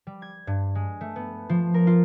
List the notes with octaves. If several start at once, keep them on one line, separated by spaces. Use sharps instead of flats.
G3
G#6
G2
G#3
A3
B3
F3
A#4
F4